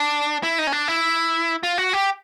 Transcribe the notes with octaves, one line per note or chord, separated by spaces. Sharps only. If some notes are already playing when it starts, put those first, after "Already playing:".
Already playing: D4
E4
D#4
C#4
D4
E4
F4
F#4
G4